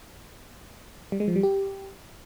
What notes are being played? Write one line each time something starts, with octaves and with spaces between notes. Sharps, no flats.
G3
G#3
F3
G3
G4